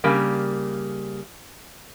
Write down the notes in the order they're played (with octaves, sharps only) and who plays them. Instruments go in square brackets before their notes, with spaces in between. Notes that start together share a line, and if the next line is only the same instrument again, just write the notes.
[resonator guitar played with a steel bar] C#3 G3 A#3